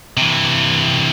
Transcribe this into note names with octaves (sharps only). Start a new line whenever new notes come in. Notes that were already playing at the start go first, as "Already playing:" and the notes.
C3 E3